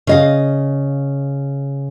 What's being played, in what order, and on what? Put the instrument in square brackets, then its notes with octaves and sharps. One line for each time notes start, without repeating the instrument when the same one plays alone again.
[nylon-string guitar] C#3 D#5 F5